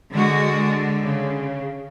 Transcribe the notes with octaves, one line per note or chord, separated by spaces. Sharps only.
D3 G#3 F#4
C#3